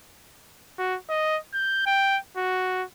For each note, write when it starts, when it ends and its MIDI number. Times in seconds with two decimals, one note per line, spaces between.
0.78 0.97 66
1.09 1.38 75
1.54 1.84 91
1.86 2.18 79
2.37 2.84 66